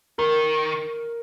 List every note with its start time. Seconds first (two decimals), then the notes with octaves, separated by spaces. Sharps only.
0.18 D#3 A#4